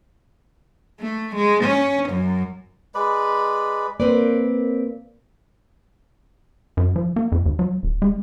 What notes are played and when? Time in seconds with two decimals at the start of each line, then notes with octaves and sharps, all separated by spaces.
1.00 A3
1.35 G#3
1.64 C#4
2.10 F#2
2.95 G#3 B4 D5 B5
4.00 A#3 C4 B4 D5
6.77 F#2
6.96 F3
7.16 A#3
7.32 F2
7.46 D#2
7.59 F#3
7.83 D#1
8.02 G#3